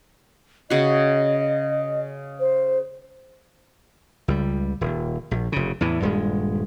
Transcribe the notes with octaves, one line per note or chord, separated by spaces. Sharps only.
C#3 F#4 D#5
C5
C#2 G3
D#1
A#1
F1 C#3
E2 A2 E3
D#1 G2 G#3